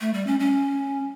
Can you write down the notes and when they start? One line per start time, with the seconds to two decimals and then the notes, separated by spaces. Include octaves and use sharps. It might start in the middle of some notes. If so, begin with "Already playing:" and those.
0.01 A3
0.14 G3
0.27 C#4
0.40 C#4